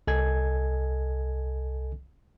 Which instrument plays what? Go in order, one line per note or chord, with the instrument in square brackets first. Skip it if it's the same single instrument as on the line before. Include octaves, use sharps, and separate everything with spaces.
[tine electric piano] C2 A4 D#5 G#5 G#6